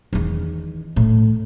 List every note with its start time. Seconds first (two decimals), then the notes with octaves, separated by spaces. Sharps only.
0.13 E2 D#3
0.96 A2